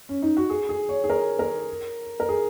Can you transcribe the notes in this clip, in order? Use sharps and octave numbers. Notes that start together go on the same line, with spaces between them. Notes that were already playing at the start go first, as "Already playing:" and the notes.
C#4
D#4
F#4
G#4
G#4
C#5
G#4
A#4
A#4
A#4
G#4